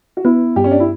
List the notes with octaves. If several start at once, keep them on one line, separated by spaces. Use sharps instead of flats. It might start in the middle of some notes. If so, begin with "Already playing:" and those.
F#4
B3 E4
G2 G4
C#4
D4
E4